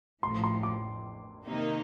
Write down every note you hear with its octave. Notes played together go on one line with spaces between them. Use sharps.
A1 A2 F3 C6
C6
D6
C3 D#3 A#3 D#4